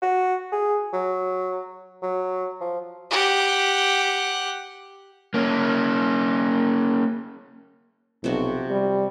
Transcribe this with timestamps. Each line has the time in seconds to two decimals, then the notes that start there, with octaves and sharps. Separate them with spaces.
0.02 F#4
0.52 G#4
0.93 F#3
2.03 F#3
2.61 F3
3.10 G4 F#5
5.34 A#3 C#4
8.24 B1 C3 F3 F#4
8.70 G3